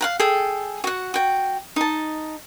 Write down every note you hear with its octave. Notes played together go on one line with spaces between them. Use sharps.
F5 F#5 A#5
G#4 A4 G5
F#4 F#5
F#4 G5
D#4 A5